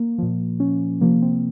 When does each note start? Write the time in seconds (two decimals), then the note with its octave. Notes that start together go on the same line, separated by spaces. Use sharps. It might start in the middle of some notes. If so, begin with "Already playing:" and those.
Already playing: A#3
0.18 A#2 F3
0.60 C#4
1.01 C3 F3 A#3
1.22 C4